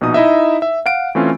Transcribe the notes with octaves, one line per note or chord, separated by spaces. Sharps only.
A#1 B2 D#4 D#6
D#4 E4 D#5 E5
E5
F5 F#5 D7
E3 A3 C4 C#4 F4